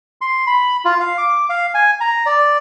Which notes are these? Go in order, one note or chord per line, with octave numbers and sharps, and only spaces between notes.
C6
B5
F4
F5
D6
F5
G#5
A#5
D5